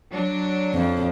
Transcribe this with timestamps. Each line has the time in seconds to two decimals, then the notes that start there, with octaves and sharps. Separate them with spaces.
0.12 F#3 D4
0.74 F2